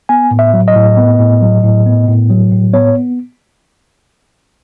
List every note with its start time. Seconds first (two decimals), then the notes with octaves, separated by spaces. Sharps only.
0.09 B3 G#5
0.31 A2
0.39 E5
0.54 F#3
0.68 D#5
0.75 A2
0.97 B3
1.19 A2
1.41 F#3
1.63 A2
1.86 B3
2.08 A2
2.30 F#3
2.52 A2
2.74 B3 C#5